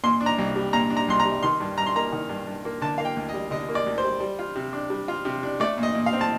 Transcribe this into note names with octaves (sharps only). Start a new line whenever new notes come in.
A#2 C6
D4
A#5
C2
G3
A#2 A#5
D4
A#5
C2 C6
A#5
G3
D#3 C6
G2
G2 A#5
C6
A#3 A#5
D#3
G2
G2
A#3
D3 A5
A#3 F5
G5
D2
D#5
G3
D3 D#5
A#3
D5
D2
C5
G3
G3
F4
C3
D4
G3
F4
C3
D4
A3 D5
A#2
D#5
A#2
F5
C4
A5